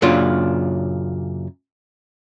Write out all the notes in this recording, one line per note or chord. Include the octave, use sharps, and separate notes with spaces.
F#2 A#2 C#3 D4 F4